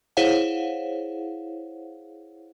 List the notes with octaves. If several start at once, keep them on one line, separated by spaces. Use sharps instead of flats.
E4 G#4 C5 C#5 F5 F#5